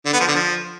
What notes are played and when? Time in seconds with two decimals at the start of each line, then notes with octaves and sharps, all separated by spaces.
0.06 D3
0.13 B3
0.20 F3
0.28 D3
0.35 F3